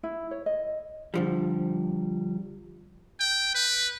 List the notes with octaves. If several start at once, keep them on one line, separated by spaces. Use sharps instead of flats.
E4
C#5
D#5
D3 F3 G3
G5
B4